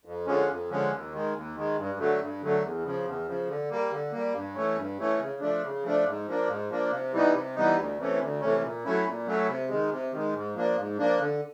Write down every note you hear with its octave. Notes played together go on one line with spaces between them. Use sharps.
F2
D3 F3 G#3 C#4
F2
D3 F3 G#3 C#4
D#2
D#3 G#3
D#2
D#3 G#3
G2
D3 F#3 A3
G2
D3 F#3 A3
E2
C#3 F3
E2
C#3 F3
D3
G3 A#3
D3
G3 A#3
G2
E3 A3 C#4
G2
E3 A3 C#4
C#3
F3 A3 D4
C#3
F3 A3 D4
G#2
F3 A#3 D4
G#2
F3 A#3 D4
C3
E3 G3 B3 D#4
C3
E3 G3 B3 D#4
D2
C3 E3 A3 C#4
D2
C3 E3 A3 C#4
A#2
F#3 A3 C#4 E4
A#2
F#3 A3 C#4 E4
C3
D#3 G#3
C3
D#3 G#3
G#2
F3 A#3 D4
G#2
F3 A#3 D4
D3